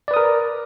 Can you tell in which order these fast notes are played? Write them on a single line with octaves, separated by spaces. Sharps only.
D5 B4 D#6 A#4